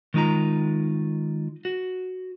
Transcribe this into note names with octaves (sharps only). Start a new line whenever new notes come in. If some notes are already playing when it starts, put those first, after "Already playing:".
D#3 G#3 D#4 F4 A#5
F#4